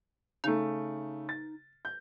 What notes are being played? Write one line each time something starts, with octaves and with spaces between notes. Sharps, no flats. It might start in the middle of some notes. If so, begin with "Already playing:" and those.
C#3 A3 D#4
A6
G6